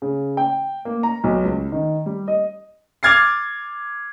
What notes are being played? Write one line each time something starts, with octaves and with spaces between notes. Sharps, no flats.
C#3
G5
A#3
A#5
B1
C#2
D#3
G3
D#5
D6 F6 G#6 A6 C7